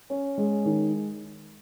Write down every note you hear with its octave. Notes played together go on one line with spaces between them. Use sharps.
C#4
G#3
D#3